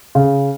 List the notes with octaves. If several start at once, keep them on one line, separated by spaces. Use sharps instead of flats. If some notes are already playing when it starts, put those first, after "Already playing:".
C#3